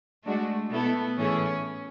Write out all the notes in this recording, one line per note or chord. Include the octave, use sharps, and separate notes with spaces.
G#3 A3 D4 F#4
B2 A3 B3 E4 A4
A2 E3 A3 C#4 E4 G#4